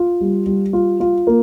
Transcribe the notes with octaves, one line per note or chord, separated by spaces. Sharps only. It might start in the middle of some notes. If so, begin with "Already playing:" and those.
Already playing: F4
G3
G3
F4
F4
A#3